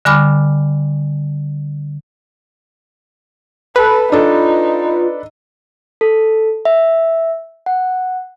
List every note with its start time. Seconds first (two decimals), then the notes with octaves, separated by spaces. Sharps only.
0.05 D3 G3 G#5 B5 D6 F6
3.76 A4 B4
4.12 D4 D#4 F4 A4
6.01 A4
6.65 E5
7.66 F#5